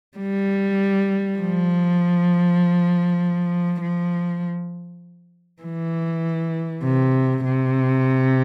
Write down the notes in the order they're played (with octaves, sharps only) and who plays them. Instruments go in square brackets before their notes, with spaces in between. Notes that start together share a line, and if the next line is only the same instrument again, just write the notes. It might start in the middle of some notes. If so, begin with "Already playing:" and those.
[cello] G3
F3
F3
E3
C3
C3